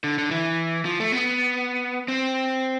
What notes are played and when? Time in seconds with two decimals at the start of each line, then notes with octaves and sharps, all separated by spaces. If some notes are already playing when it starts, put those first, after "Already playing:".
0.04 D3
0.19 D3
0.31 E3
0.85 F3
1.00 A3
1.12 B3
2.08 C4